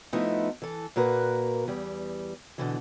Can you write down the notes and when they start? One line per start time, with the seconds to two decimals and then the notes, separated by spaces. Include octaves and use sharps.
0.13 F3 A3 B3 D#4 E4
0.62 E3 A4
0.96 A#2 A#3 F#4 A#4 B4
1.68 E2 G3
2.58 B2 D3 E3